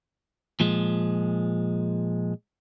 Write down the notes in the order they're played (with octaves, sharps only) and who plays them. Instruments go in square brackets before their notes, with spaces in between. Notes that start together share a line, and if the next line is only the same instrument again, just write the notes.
[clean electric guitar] A#2 F3 G#3